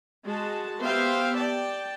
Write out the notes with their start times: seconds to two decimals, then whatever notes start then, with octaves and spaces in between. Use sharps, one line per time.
0.24 G#3 F#4 A5
0.82 B3 G4 C5 E5 F5 G5
1.37 D5 G5 A5